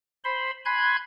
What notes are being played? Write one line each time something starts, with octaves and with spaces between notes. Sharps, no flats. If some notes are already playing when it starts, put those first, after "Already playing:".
C5 B5 C6
G#5 B5 C6 F#6 G#6